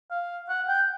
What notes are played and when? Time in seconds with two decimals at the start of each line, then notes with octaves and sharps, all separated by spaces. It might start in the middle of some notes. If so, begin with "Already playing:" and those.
0.11 F5
0.49 F#5
0.68 G5